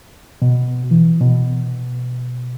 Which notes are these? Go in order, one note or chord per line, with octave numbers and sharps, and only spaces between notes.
B2
E3
B2